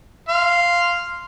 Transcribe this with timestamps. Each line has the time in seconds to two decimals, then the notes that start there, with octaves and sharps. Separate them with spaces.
0.29 F5 C6